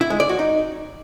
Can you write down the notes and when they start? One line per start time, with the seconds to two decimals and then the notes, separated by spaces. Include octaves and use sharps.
0.01 E4
0.10 G#3
0.20 D5
0.29 F#4
0.39 D#4